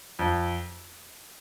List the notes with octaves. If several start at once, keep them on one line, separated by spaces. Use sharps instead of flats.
F2